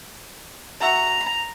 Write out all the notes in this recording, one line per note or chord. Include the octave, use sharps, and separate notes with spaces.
F#4 E5 A#5 C#6
B5